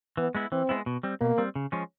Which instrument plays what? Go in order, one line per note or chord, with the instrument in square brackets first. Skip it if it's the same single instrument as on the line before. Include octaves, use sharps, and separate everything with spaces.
[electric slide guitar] E3 [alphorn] B3
[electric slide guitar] G#3 B3 E4
[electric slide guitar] E3 [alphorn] C4
[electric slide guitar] G#3 B3 E4
B2
G3 C4
[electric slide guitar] B2 [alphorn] A#3
[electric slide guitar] G3 C4
C#3
F3 G#3 C#4